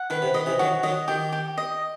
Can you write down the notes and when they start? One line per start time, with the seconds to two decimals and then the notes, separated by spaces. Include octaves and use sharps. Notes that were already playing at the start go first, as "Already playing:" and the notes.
Already playing: F#5
0.10 D#3 B4
0.22 C3
0.34 D#3 D#5
0.46 C3 E3
0.59 D#3 F#3 F#4
0.83 D#3 F#3 D#5
1.08 D#3 G4
1.32 G4
1.58 D#5